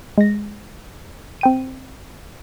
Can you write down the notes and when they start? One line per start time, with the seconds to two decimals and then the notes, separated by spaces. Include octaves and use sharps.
0.18 G#3 A#6
1.41 C4 G5 D#7